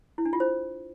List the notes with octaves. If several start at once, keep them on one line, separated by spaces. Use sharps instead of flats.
E4
D4
F4
C5